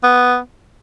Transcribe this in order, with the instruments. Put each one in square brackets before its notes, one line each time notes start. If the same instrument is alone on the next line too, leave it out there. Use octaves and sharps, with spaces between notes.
[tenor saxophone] B3